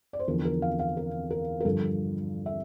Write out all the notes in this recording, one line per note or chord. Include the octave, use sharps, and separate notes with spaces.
D5
C5
E2 D3 F3 A#4
A#4
F5
F5
A#4
A#4
A#4
G2 D3 F3 A4
E5